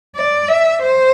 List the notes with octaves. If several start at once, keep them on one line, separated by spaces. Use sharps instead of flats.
D5
E5
C5